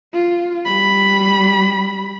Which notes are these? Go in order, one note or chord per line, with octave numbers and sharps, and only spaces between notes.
F4
G3 B5